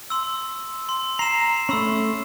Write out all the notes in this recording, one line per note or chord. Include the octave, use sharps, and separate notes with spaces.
C6 E6
C6
A#5 C7 E7
A3 C#4 B5 C6 E6